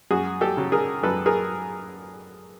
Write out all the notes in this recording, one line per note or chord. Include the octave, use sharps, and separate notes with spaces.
F#2 F#4 G#4
G4 A4
C#3 F#3
G#4 A#4
F#2 A4 B4
G#4 A#4